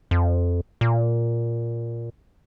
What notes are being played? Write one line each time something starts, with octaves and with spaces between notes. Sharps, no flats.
F2
A#2